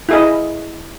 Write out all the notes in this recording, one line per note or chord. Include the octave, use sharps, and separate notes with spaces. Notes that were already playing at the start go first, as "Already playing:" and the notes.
E4 G#4 D#5